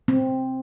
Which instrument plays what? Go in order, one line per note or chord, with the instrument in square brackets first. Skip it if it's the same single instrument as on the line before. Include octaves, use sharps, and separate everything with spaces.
[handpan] C4